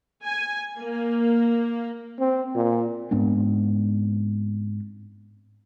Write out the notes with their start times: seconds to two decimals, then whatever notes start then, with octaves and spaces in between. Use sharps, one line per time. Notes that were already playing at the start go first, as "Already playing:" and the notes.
0.25 G#5
0.78 A#3
2.19 C4
2.55 A#2
3.11 G#2 B3 C4 D4